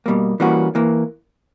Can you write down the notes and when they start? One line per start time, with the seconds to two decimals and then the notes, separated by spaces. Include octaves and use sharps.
0.06 B2 G3 A#3
0.40 E3 G3 A#3 C#4 F#4
0.75 E3 A#3